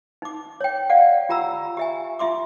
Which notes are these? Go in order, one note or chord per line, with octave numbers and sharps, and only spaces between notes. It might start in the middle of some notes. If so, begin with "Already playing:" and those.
D#4 D6
C#5 G5
D5 F5 F#5
F4 G4 A#5 B5 E6
G4 E5 G#5
F4 E5 C6 D6